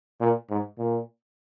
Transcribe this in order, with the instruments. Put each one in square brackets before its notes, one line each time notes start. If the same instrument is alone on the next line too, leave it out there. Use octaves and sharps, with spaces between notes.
[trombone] A#2
G#2
A#2